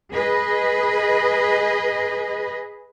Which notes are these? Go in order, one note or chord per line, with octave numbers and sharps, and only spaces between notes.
G#4 B4 D#5